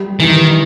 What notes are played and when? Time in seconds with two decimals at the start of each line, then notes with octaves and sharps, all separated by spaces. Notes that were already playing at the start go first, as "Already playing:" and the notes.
Already playing: G3
0.20 D#3 E3